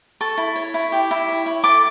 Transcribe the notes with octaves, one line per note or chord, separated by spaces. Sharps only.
A4 C#6
E4
C#5
E4
G4
E4
C#5
E4
A4 D6